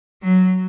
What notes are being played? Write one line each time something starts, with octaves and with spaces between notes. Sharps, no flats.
F#3